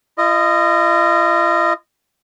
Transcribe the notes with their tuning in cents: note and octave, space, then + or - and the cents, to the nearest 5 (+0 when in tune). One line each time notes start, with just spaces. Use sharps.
F4 -45 D#5 -10